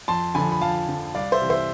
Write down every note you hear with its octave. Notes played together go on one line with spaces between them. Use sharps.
F2 A5 C6
D3 F3 G#5 B5
B5
F2 F5 A5
D3 F3
C2 D5 F5
C5 E5
C3 E3
C5 E5